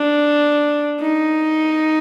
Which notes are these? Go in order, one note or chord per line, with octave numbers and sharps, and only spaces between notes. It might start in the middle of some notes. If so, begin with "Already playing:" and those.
Already playing: D4
D#4